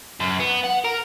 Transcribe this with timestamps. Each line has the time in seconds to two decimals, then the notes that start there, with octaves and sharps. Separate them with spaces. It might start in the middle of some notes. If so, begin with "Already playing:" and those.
0.20 F#2
0.40 B3
0.64 F#5
0.85 A#4